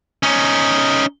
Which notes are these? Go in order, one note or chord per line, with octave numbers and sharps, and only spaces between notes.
C#4 D#4